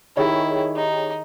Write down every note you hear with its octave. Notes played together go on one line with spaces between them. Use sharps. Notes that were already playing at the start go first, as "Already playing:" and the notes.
D#3 E4 G4 G#4 C#5
D#4